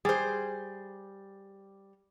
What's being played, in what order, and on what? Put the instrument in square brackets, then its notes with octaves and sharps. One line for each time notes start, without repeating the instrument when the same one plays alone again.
[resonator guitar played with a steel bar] G3 C5 [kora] G#4